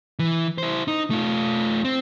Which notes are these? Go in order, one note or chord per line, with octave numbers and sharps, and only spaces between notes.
E3
E4 C5
D#4
A3 F4
C4